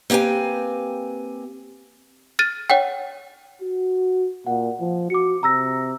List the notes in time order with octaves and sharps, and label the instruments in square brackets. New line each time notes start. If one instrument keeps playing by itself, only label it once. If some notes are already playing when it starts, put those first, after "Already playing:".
[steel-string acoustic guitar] A#3 C4 G4 B4 G#5
[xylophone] F6 A6 D#7
C#5 F#5 G5
[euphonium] F#4
[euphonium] A#2 [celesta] F#5
[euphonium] F3
[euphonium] F#4 [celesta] D6 C#7
[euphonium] C3 [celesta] A#5 E6 A#6